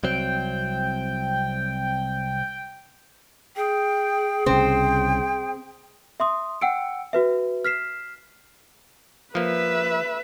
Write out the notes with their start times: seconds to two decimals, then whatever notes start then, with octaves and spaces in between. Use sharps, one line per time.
0.04 C2 F#3 C4 G5
3.56 G#4 G5
4.46 C2 C#3 C4 G5
6.20 E5 C6 D#6
6.61 F#5 G5 E6 C#7 D7
7.13 F#4 B4 E5
7.65 F6 B6 C7 E7
9.35 F3 A#3 B4 E5